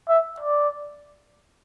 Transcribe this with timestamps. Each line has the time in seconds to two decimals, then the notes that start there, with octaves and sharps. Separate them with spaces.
0.09 E5
0.40 D5